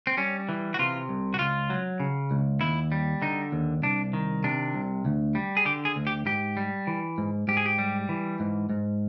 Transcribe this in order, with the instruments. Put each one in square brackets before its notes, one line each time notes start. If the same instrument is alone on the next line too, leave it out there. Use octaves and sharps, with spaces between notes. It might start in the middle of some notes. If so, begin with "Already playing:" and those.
[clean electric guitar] C4
G3 C#4
E3
F#4
C3 F4
C2
F#4
C#2 F4
F#3
C#3
C#2
D#2 E4
G3
D3 D#4
D#2
C2 D4
D#3
C3 D4
C2
D2
G3
G#4
D3 G4
G#4
D2
G4
G#2 G4
G3
E3
G#2
G#2 G4
G#4
G4
G3
E3
G#2
G#2